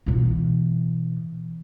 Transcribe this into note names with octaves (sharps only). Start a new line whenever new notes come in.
B2 E3